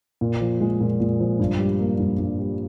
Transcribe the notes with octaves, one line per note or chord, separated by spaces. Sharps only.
A#2
F3
G#3
A#2
A#2
F3
G2
G3
A#3
G2
G2
G3